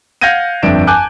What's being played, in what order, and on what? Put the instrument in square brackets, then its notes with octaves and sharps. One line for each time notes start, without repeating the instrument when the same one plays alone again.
[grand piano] F5 F#5 G6 G#6 A#6 D#7
G1 F2 D4 E5 D7 E7
G#5 A5 D6 F#6 G6